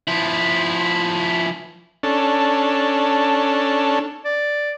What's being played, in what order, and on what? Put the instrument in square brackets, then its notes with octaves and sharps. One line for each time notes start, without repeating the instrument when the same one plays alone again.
[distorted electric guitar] F3 E4
[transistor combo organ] C#4 D4 A4
[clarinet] D5